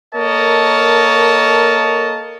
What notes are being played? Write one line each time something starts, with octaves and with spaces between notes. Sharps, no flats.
A#3 A4 A#4 C#5 D#5 A5